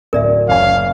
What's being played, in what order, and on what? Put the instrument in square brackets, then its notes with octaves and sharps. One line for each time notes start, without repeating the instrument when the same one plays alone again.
[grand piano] D1 [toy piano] A#4 D5 E5
[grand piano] F#1 C#4 G#5 [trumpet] F5